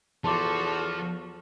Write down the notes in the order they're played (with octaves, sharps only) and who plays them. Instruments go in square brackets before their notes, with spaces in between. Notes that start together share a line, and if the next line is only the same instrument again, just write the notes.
[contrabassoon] E2 [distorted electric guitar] F3 [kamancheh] F#4 A4 [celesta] A5 C6 D6